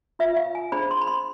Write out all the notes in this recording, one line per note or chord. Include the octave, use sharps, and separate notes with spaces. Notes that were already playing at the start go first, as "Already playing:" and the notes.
F4 B4 E5
F5
G#5
D4 G#4 C5 B5
C6
B5
C6